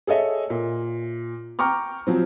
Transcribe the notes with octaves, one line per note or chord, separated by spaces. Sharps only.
G#4 A4 C#5 D#5 E5
A#2
G5 A#5 C#6 D6 F6
F3 F#3 C4